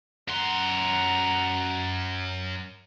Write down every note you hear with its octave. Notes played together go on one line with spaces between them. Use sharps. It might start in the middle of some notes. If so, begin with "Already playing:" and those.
F#2 F#5 A#5 C6